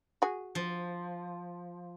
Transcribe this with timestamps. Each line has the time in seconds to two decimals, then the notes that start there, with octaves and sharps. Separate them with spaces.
0.22 F#4 G#4
0.55 F3